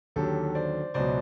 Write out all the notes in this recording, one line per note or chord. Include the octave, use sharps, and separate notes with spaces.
D#2 D3 F#3 G4 A4
C5 D5
C#2 B2 F#3 C5 D5